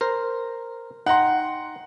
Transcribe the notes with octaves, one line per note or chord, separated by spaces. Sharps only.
A#4 C5
D#4 F#5 G5 A#5 C6